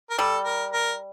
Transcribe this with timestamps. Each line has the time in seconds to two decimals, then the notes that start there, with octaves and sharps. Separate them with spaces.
0.10 A#4
0.18 G3 A4
0.45 A#4
0.73 A#4